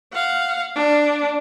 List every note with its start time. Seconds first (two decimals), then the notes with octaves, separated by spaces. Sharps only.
0.13 F5 F#5
0.75 D4